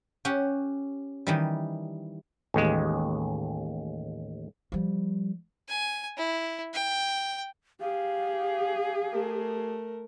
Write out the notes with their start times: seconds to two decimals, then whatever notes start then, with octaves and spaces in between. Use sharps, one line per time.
0.25 C#4 G4 F#5
1.27 D#3 E3 G3
2.54 A1 D#2 G#3
4.72 F3 G3
5.69 G#5
6.17 E4
6.73 G5
7.81 G4 G#4 F5
9.11 A3 A#4